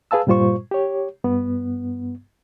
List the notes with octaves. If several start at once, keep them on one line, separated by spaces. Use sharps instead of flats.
G#4 B4 F5 A5 E6
G2 A#2 G3 F4 C5 C#6
G4 C#5
G2 B3